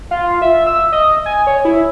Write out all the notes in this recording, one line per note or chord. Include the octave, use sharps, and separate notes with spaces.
F4
E5
E6
D#5
G#5
C#5
E4